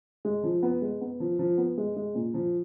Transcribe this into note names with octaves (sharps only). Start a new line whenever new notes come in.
G#3
F3
B3
G#3
B3
F3
F3
B3
G#3
G#3
A#2
F3